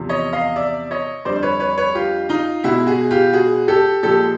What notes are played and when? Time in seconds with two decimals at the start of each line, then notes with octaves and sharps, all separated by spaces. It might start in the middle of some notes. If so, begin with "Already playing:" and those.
Already playing: E2 C3 F3
0.09 C#5 D#5
0.33 D#5 F5
0.56 D5 E5
0.91 C#5 D#5
1.25 F2 D3 G3 C5 D5
1.43 B4 C#5
1.60 B4 C#5
1.78 B4 C#5
1.95 F4 G4
2.29 D#4 F4
2.64 B2 G#3 E4 F#4
2.87 F#4 G#4
3.11 F4 G4
3.33 F#4 G#4
3.68 G4 A4
4.03 A#2 F3 G#3 G4 A4